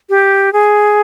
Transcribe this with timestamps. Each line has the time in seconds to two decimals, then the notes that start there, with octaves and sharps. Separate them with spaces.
0.09 G4
0.53 G#4